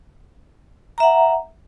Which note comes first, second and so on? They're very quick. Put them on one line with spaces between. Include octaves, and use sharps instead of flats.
A#5 E5 F#5